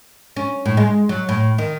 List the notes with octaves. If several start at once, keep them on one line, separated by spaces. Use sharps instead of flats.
C#4
A2
G#3
F#3
A2
D#3